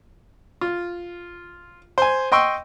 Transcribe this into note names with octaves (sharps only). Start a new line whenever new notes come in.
F4
C5 G#5
D#5 G5 C6 C#6 E6